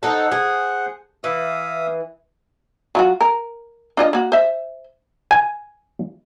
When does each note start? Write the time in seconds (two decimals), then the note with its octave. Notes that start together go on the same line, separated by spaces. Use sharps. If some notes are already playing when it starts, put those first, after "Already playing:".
0.03 D#4 A4 C5 F#5
0.32 G#4
1.24 E3 E5 F5 D#6
2.95 F#3 F4 F#4
3.21 A#4
3.97 D4 F4 D#5
4.13 A#3 F#4
4.32 C5 E5
5.31 G#5